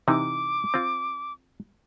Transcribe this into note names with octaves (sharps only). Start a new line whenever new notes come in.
C3 E3 D#4 D6
C4 F4